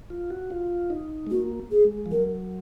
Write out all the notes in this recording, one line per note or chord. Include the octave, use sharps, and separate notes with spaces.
F4
F#4
F4
D#4
G#3
A#3 F#4
G#4
G#3
F3
F#3 A#4